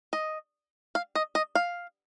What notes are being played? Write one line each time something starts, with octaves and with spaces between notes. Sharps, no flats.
D#5
F5
D#5
D#5
F5